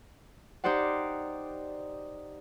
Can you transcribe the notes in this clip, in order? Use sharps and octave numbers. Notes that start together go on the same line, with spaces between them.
D#4 G4 C5 D5 F#5